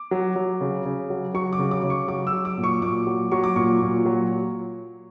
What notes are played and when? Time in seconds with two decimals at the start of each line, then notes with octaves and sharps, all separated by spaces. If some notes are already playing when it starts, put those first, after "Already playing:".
Already playing: D6
0.11 F#3
0.36 F#3
0.61 C#3
0.85 C#3
1.10 F#3
1.34 F#3 C#6
1.53 D6
1.59 C#3
1.71 D6
1.83 C#3
1.90 C#6
2.08 F#3 D6
2.27 E6
2.33 F#3
2.45 D6
2.58 A#2
2.64 C#6
2.82 A#2 D6
3.07 F#3
3.32 F#3 C#6
3.44 D6
3.56 A#2 C#6
3.81 A#2
4.06 F#3